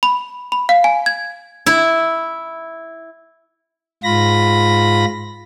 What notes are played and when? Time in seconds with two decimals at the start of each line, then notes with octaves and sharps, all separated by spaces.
0.03 B5
0.52 B5
0.69 F5
0.84 G#5
1.06 G#6
1.66 E4
4.04 G#2 F4 B5 A#6